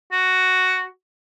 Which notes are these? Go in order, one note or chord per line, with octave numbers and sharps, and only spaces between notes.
F#4